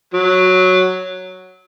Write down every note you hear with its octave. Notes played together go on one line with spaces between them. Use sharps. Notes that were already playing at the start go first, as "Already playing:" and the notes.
F#3